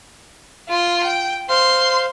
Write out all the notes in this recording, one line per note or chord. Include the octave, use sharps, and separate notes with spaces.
F4 C6
G5
C5 F5 C6